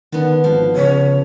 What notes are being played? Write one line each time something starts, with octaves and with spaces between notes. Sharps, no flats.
D3 D#3 B3
G#1 F3
C#3 C#5